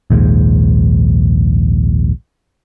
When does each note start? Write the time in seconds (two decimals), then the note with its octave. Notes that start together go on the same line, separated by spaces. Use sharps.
0.10 A#1 D#2 G#2